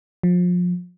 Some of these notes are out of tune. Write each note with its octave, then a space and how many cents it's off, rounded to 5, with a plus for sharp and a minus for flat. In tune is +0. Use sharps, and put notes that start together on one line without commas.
F3 +30